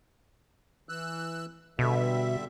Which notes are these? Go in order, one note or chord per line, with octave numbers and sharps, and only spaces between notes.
E3 E6 F#6
B2 D3 G3 E5